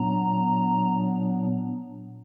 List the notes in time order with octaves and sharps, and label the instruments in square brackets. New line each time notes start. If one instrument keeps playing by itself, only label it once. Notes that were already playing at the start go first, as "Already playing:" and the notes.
Already playing: [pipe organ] A#2 F#3 B3 D4 A#5